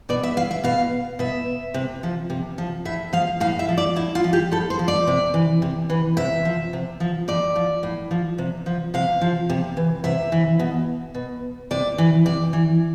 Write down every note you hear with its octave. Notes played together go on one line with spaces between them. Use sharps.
B2 D5
E5
F5
E5
B2 F5
B2 E5
C3
F3
C3
F3
A2 E5
F3 F5
A2 F5
E5
F3
D5
A2 E4
F4
F3
G4
A2 A4
C5
F3
D5
C3
E3
C3
E3
C3 E5
F3
C3
F3
A2 D5
F3
A2
F3
C3
F3
C3 F5
F3
C3
E3
C3 E5
E3
B2
B2
C3 D5
E3
C3 D5
E3